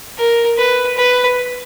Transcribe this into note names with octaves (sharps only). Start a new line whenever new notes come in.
A#4
B4
B4